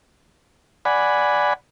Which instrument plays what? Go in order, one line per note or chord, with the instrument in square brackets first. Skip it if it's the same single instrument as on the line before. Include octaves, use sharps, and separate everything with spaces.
[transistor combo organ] D5 F#5 G#5 B5